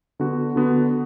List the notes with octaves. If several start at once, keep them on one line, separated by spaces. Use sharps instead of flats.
D3 B3 F#4
D3 B3 F#4